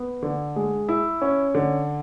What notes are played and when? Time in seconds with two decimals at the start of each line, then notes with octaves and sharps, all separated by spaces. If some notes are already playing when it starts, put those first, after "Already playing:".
Already playing: B3
0.23 D3
0.56 G#3
0.89 E4
1.22 C#4
1.55 D3